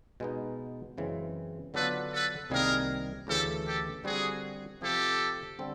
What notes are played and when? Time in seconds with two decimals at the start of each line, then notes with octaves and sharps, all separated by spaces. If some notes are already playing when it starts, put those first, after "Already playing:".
0.20 B2 G#3 B3 D#4
0.97 F#2 C#3 E3 G#3 C4
1.73 D3 F#3 B3 D4 F4 A4 B4
2.12 A4 B4
2.50 C2 C3 D#3 G3 A#3 G#4 A#4
3.27 D2 C#3 E3 A3 G4 A4
3.65 G4 A4
4.04 D3 G3 C4 F#4 G#4
4.81 C3 F3 A3 G4 A4
5.59 D3 G3 C4